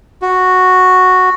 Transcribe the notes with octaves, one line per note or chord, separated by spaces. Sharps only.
F#4